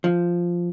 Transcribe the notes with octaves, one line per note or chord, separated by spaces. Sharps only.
F3